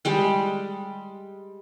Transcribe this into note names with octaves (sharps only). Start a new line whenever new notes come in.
G3 G#3 G5